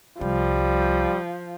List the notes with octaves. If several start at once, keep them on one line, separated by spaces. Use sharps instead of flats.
C2 F3 G3